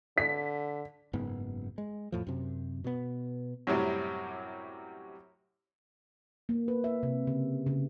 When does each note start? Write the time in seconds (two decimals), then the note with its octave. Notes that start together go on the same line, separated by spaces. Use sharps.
0.18 D3 B6
1.13 F#1 G#2 B3
1.78 G#3
2.12 F2 A2 F3
2.27 F#2 C3
2.84 B2 B3
3.67 F#2 A2 C3 F#3 G3
6.49 A#3
6.68 B4
6.84 E5
7.03 C3
7.27 C#3
7.66 C#3